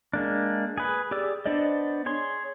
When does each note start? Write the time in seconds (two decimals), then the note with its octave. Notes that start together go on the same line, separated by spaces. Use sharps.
0.13 G#3 A#3 D4
0.78 G#4 B4
1.11 G4 G#4 D5 E6
1.46 B3 D4 C5 D5 D#5
2.06 G#4 C#5 C6